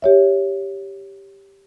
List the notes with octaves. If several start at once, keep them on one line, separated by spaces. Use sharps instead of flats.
G4 C#5 E5